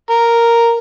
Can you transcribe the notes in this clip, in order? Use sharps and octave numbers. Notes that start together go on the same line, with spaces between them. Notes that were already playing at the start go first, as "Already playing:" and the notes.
A#4